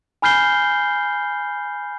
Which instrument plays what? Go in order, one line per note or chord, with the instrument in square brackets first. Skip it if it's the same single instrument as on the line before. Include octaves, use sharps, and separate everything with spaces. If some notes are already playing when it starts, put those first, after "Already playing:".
[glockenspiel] G#5 B5 F6 G6 C7 G7